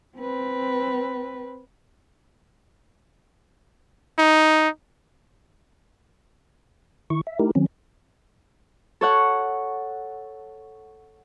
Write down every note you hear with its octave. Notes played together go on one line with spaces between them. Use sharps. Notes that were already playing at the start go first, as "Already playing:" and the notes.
C4 B4
D#4
D#3 E4 C#6
E5
A3 D#4 E4 G4 A#4
D#3 F#3 C4 C#4
A4 C#5 F#5